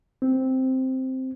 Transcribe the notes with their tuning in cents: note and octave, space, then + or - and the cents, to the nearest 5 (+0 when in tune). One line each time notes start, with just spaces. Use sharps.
C4 +0